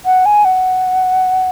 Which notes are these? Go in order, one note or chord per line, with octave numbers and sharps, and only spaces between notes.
F#5
G#5
F#5